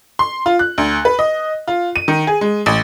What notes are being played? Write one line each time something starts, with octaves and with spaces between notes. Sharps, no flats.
C6
F4
F#6
D2
B4
D#5
F4
D#7
D#3
G#4
G#3
A1